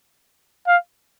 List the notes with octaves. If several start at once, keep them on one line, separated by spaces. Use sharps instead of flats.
F5